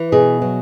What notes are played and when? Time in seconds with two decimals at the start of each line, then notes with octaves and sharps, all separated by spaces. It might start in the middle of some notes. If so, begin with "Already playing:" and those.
Already playing: E3
0.12 B2 G#4
0.42 F#3